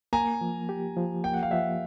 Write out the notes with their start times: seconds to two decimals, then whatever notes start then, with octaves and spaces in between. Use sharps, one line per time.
0.13 A#3 G#5 A#5
0.41 F3
0.69 G4
0.97 F3
1.24 A#3 G5
1.34 F#5
1.43 F5
1.51 F3 E5 F#5